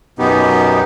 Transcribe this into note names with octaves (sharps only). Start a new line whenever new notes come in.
F#2 B2 B3 D#4 G4